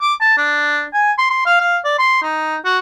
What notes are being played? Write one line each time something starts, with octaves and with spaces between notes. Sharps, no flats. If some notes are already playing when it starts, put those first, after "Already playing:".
D6
A5
D4
G#5
C6
C6
F5
F5
D5
C6
D#4
F#4